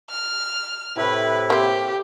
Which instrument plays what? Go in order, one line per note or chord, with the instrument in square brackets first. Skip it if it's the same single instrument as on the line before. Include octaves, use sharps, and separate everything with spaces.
[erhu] F6
[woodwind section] A2 C3 [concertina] E4 [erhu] B4
[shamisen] A#3 C4 [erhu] G4